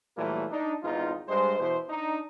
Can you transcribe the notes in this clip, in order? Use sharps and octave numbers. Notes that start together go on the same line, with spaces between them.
A#2 E3 F#3 G3 A3 A#3
D4 D#4
G#1 E2 E3 D#4 F4
G2 G#3 C5
B2 E3 E4 C5
D4 D#4